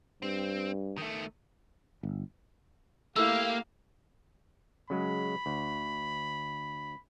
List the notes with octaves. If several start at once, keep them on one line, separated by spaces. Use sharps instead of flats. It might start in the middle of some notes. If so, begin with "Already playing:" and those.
G2 C4
D#3 A3
G1
A3 A#3 E4 G4 F5 E6
C#3 F#3 G#3 B5
D2